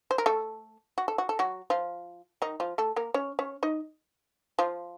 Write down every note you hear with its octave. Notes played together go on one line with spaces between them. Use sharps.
C5
A#4
A3 A4
F#4
A4
F#4
A4
F#3 F#4
F3 F4
D#3 D#4
F3 F4
A3 A4
A#3 A#4
C#4 C#5
C#4 C#5
D#4 D#5
F3 F4